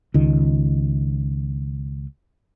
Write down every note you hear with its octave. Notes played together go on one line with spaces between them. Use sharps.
C#2 D#3